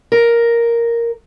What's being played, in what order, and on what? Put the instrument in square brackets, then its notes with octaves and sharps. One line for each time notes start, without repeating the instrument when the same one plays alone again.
[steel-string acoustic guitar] A#4